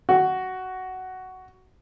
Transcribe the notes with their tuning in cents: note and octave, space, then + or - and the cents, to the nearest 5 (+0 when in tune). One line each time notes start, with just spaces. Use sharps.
F#4 +10